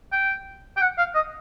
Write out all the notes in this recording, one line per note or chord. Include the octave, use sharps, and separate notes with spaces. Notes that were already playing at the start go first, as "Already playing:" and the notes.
G5
G5
F#5
F5
D#5